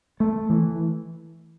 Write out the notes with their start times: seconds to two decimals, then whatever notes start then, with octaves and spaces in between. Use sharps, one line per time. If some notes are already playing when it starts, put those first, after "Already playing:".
0.20 A3
0.50 E3